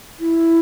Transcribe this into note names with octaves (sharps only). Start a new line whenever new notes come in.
E4